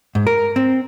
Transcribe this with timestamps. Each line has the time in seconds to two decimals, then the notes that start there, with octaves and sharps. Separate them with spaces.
0.15 G#2
0.27 A#4
0.56 C4